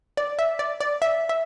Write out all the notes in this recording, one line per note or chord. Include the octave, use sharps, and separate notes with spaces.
D5
E5
D5
D5
E5
E5